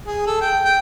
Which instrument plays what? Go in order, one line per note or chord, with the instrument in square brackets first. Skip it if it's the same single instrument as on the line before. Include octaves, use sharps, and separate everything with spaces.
[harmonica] G#4
A4
G5
G5